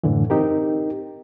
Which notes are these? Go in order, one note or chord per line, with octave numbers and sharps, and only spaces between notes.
F#2 A2 D3 E3
C4 D#4 G4 A#4